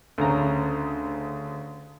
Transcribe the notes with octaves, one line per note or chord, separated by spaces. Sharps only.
D2 C#3 A#5